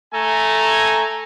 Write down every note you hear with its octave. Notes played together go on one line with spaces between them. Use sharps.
A3 A4 G#5 A#5